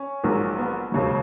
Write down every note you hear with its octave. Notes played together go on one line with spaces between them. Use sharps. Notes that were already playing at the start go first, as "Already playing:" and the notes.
Already playing: C#4
A#1 G#2 D#3 F#3
B3
E1 D#2 C#3 F#3